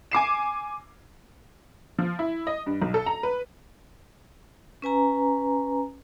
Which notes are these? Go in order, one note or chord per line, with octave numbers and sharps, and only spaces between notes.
G#5 D6 C7 E7
F3
E4
D#5
G2
B1
A4
A#5
B4
C#4 B4 G#5 A#5